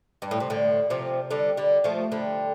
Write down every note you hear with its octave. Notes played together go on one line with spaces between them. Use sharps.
G2
A2
C3
A2 D3
C3 F3
D3 G3
D3 G3
F3 A3
D3 G3